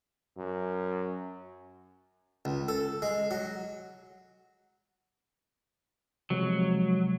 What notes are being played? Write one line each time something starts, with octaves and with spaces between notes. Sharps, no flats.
F#2
C#2
A4
G#3
F#3
C3 F3 F#3 G#3